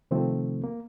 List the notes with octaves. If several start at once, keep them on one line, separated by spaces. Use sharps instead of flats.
C3 D#3 F3 A3 C4
A#3